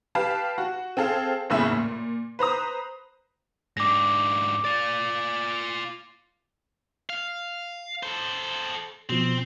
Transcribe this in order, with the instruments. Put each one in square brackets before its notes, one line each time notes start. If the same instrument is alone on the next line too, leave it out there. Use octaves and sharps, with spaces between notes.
[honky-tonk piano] G4 B4 F5 A5
F#4
C4 G#4 A4 F5
F#1 E2 A2 C#3 E5 B5
A#2
B4 C5 A#5 D#6
[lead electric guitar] G#2 D4 [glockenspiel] D6 A#6
[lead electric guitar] F4 D5 [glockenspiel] A6
[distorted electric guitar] F5
A4 C5
[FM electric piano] B2 F3 [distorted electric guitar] C4